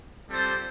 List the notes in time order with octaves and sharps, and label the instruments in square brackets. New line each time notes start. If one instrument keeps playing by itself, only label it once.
[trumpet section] G3 C4 F4 A4 C5